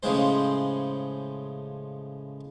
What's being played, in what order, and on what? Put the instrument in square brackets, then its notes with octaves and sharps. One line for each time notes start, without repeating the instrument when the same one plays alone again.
[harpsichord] A2 C#3 F3 G#3 C5